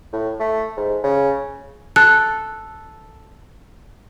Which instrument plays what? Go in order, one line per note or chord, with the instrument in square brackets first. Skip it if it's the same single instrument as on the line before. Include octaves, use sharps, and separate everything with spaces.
[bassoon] A2
A3
G#2
C#3
[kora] A4 [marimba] F#6